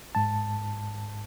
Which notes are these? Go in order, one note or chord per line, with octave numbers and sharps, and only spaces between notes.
G#2 A5